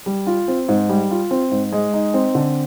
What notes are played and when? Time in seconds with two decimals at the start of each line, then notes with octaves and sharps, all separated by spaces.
0.06 G3
0.27 F4
0.48 C4
0.69 G#2
0.89 G3
1.11 F4
1.31 C4
1.52 G#2
1.72 G#3
1.93 D#4
2.14 C4
2.35 D3